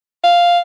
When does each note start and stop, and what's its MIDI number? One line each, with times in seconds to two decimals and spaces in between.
0.24 0.59 77